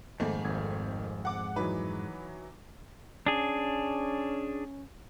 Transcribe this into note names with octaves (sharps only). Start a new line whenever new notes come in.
F2 G#2 D#3 A3 A#3
G#1 G#6
F#5 D6
E3 F#3 D#4 B4
C#4 D4 G#4